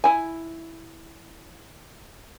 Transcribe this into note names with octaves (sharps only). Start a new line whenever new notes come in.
E4 G#5